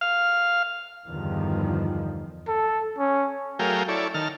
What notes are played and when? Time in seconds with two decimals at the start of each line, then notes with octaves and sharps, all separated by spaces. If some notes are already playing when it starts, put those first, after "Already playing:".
0.01 F5
1.07 E2 G2 D3 D#3 F3
2.48 A4
2.98 C#4
3.59 F#3 A3 G#4 A#4 F5 G5
3.88 E4 A4 C#5 D5
4.14 D#3 A5 F6